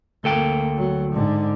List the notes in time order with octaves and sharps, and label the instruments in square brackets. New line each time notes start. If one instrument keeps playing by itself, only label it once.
[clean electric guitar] D2 A4 G5 [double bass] A#3
[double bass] F#3
G#2 D3